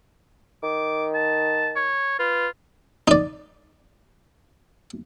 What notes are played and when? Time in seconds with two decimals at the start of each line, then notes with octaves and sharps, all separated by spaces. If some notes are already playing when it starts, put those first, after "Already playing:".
0.63 D#3 D6
1.14 A5
1.76 C#5
2.19 F4 B4
3.08 D#4 D5